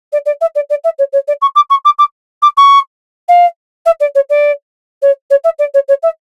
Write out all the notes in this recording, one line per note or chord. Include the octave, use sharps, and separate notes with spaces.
D5
D5
E5
D5
D5
E5
C#5
C#5
D5
C#6
D6
C#6
D6
D6
D6
C#6
F5
E5
D5
C#5
D5
C#5
C#5
E5
D5
C#5
C#5
E5